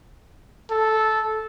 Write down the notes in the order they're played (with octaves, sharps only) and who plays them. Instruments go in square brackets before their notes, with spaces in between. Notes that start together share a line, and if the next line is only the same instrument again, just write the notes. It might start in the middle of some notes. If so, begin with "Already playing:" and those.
[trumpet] A4